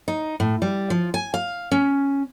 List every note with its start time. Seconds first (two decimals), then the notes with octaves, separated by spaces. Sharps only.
0.08 D#4
0.40 A2
0.62 G3
0.90 F3
1.14 G#5
1.34 F5
1.71 C#4